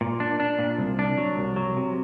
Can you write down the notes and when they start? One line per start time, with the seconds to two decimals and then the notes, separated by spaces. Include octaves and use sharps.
0.01 A#2
0.20 D4
0.40 D4
0.59 A#2
0.78 C2
0.99 D4
1.18 F#3
1.37 C2
1.56 F#3
1.77 C3